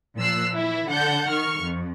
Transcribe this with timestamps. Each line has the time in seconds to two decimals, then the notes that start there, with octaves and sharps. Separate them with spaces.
0.17 A#2 F3 E6 F#6 C7
0.53 E3 E4
0.89 D3 F#5 A5 G6
1.29 D#3 C#6 F6
1.60 F2